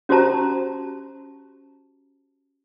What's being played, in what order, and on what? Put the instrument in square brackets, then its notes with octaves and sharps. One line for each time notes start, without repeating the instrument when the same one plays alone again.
[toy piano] C#4 F#4 G4 C5 A5 A#5